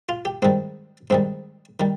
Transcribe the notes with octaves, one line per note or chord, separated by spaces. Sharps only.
F4
G4
G#2 D#3 G3 C4
G#2 D#3 G3 C4
D#3 G3